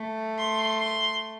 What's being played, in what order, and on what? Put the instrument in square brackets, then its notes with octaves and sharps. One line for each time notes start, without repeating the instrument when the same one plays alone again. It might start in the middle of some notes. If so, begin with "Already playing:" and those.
Already playing: [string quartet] A3
[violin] C6
C6